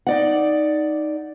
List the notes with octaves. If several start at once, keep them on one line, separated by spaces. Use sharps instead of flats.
D#4 D5 F#5